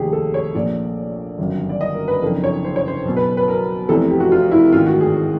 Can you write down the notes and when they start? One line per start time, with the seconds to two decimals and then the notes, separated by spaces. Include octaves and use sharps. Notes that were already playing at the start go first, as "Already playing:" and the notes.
Already playing: F1 D#2 D#3 G4 G#4
0.13 A4
0.34 C#5
0.54 A#1 A#2 D5
1.38 G1 F#2 D#3
1.69 D5
1.81 D#5
1.94 A#4
2.08 B4
2.22 F#1 F2 D3 A#4
2.44 C#5
2.64 C5
2.76 C#5
2.88 C5
3.05 B1 B2
3.16 B4
3.37 B4
3.48 A#4
3.89 F1 E2 C3 A4
4.11 G4
4.20 F#4
4.32 F4
4.51 E4
4.72 A1 G#2 D#3 F4
4.86 F#4
5.01 G#4